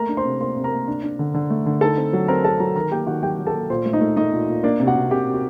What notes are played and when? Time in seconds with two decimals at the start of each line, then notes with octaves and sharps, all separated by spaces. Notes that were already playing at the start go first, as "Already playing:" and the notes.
Already playing: A3 A#3 A#4 A#5
0.09 D4
0.17 C5 C6
0.25 C3
0.41 A#3 C5 C6
0.57 C3
0.64 A#4 A#5
0.72 A#3
0.88 D4
1.03 D4
1.19 D3
1.34 D3
1.50 A3
1.66 D3
1.81 D#4 A4 A5
1.98 C4
2.13 F#3
2.28 C4 A#4 A#5
2.44 C4 A4 A5
2.60 F#3 A#4 A#5
2.76 D#3 A#4 A#5
2.91 A#3 G4 G5
3.07 D#3 F#4 F#5
3.23 F#3 G4 G5
3.39 F#3
3.47 A4 A5
3.54 A#3
3.70 A#2 C5 C6
3.86 A3
3.93 D#4 D#5
4.01 A3
4.16 A3 D#4 D#5
4.33 A#2
4.49 A#2
4.64 A#3 D4 D5
4.80 C3
4.87 F#4 F#5
4.96 C3
5.11 C3 G4 G5
5.27 C3
5.34 F#4